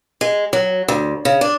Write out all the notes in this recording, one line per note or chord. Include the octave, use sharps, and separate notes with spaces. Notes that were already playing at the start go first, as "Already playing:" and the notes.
G#3
F#3
D2
C#3
D4